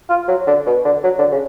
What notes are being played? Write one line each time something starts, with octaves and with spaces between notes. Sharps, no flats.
F4
F#3
D3
B2
D3
F#3
D3
C#3